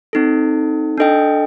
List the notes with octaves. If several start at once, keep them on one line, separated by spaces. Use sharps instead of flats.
C4 D#4 A4
D4 A4 D#5 G5